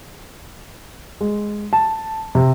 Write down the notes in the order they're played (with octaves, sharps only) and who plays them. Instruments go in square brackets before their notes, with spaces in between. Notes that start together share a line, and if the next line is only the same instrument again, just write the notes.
[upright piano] G#3
A5
C3